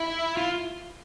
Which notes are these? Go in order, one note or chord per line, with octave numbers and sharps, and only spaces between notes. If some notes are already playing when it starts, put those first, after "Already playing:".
Already playing: E4
F4